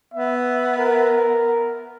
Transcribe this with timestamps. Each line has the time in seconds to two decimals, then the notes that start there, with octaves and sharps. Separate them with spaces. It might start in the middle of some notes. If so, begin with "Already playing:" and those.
0.14 B3 E5
0.78 A#4